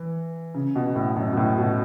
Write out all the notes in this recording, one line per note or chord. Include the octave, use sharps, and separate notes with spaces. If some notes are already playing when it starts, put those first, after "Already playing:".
Already playing: E3
C#3
B2
A2
F#2
B2
A2
B2